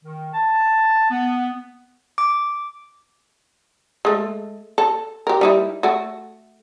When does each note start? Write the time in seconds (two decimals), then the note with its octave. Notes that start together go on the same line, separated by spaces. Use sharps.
0.04 D#3
0.34 A5
1.10 B3
2.18 D6
4.05 G#3 A3
4.78 A4
5.27 G4 A#4
5.41 G3 D#4 E4
5.83 A3 F#4